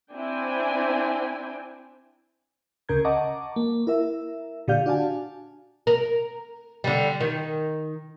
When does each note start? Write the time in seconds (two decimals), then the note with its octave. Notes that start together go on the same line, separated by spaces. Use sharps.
0.14 C4 D4 E4 G5 G#5
2.89 D2 C#3 A#4 A#5 G6 G#6
3.05 D#5 F#5 A5 A#5 C#6 D6
3.56 A#3
3.87 E4 A#4 E5
4.68 A#2 D3 G4 D5 F5 G6
4.86 D4 F#4 D5 F5 G#5 A5
5.87 A#4
6.84 D3 G3
7.20 D#3